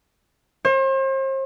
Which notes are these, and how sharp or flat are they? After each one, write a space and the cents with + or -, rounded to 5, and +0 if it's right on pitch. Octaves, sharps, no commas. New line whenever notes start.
C5 +40